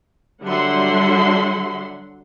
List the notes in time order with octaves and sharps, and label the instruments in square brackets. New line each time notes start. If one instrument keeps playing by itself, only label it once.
[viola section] D3 F#3 G3 E5 F#5 C6